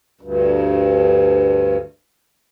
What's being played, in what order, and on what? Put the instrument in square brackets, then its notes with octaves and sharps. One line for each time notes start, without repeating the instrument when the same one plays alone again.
[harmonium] D2 G2